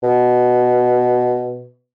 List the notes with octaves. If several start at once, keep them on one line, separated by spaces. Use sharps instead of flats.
B2